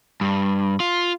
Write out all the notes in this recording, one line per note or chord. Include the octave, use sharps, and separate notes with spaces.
G2
F4